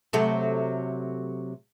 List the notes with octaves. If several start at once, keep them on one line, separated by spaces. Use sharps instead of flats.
C3 F#3 A3